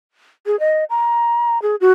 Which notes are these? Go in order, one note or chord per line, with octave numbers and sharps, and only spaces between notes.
G#4
D#5
A#5
G#4
F#4